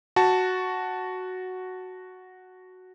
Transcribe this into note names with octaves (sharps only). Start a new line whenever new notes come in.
F#4 A5